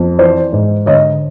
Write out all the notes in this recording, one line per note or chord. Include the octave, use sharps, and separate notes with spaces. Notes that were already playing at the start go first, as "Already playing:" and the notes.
Already playing: F2
E3 C5 D5
G#2
D3 C#5 D#5